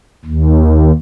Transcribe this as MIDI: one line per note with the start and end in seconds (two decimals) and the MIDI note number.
0.25 0.92 39